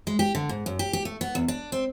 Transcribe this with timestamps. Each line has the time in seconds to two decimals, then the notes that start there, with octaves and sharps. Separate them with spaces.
0.07 G#3
0.19 G4
0.35 D3
0.49 G#2
0.66 F#2
0.79 G4
0.93 G4
1.05 A3
1.21 B3
1.35 E2
1.48 D4
1.72 C4